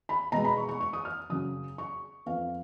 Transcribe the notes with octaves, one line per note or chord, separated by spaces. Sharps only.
B5
B2 G#3 B3 A#5
B5
C#6
C#6
C#6
D#6
F6
F#2 C#3 F#3 C#4 D#6
C#6
F2 F3 B3 F5